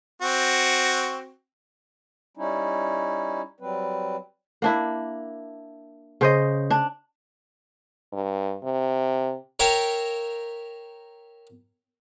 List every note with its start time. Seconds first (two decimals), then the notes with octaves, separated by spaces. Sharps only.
0.22 C4 F#4
2.37 G3 C#4 D#4 E4
3.60 F#3 G3 C4 B4
4.62 A#3 D4 E4
6.21 C#3 C5 D#5
6.70 D4
8.13 G2
8.63 C3
9.60 A#4 C#5 E5 F5 G5